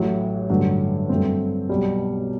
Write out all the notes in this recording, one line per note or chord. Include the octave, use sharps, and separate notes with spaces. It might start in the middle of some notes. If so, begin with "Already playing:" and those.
Already playing: A1 A2 F#3
A1 G2 D3 F#3
G2 F#3 A3 C4
B1 B2 G3